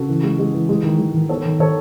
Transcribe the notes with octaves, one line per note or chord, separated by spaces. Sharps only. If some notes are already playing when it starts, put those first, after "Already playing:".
Already playing: C#3 F#4 A4
E3
G#3
G#3
E3
G#3
D#3
G#3
D#3
B3 A4 C#5
D#3
D#3 A4 C#5